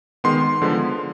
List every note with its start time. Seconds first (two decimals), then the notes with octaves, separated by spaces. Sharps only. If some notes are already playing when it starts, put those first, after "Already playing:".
0.24 D#3 G#3 B3 C6
0.62 D3 F3 G#3 B3